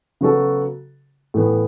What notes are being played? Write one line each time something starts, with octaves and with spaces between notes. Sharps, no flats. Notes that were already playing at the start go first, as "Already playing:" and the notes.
C#3 F#3 B3 F#4 A4
A2 E3 B3